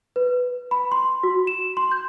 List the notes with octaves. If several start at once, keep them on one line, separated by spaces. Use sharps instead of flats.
B4
B5
C6
F#4
E7
C6
G6